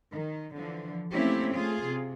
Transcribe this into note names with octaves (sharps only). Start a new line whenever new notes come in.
D#3
D3 E3 F3
A3 A#3 C4 C#4 E4 G4
A3 F4 G#4
C3